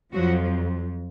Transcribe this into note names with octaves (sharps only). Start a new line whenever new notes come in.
F2 F3 F#3 F#4